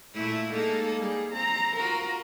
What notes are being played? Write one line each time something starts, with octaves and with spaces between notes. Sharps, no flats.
A#2 A3 E4
G#3 A#3 D#4 A4
G3 G#4
C4 A#5
F4 F#4 A#4